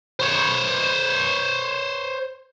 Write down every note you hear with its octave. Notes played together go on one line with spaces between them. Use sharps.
C5 C#5